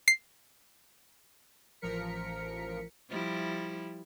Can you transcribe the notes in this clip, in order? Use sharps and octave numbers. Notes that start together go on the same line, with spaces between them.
C7
A1 F3 A#4 B6 C#7
F3 G3 E4